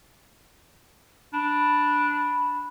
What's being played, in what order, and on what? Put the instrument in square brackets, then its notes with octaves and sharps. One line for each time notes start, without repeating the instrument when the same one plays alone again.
[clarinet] D4 [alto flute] B5